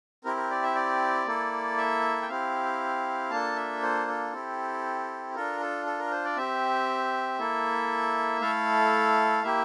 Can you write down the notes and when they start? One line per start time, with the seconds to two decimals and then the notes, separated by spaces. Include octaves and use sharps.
0.24 C4 E4 G4 A#4
0.37 A#4
0.51 D5
0.63 E5
0.75 D5
1.26 A#3 E4 A4
1.78 E5
2.22 G5
2.29 C4 E4 G4 F5
3.30 A#3 D4 F4 A4 A5
3.56 E5
3.82 C5
4.08 A4
4.33 C4 E4 G4
5.35 D4 F4 A4 A#4
5.60 A4
5.86 A4
5.99 A#4
6.11 C5
6.25 D5
6.37 C4 G4 E5
7.39 A#3 E4 A4
8.41 A3 E4 A4 F5
9.43 A#3 E4 G4 E5